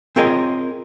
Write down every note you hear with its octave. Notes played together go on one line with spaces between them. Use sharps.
C4 F4 G#4 A#4 C#5 D#5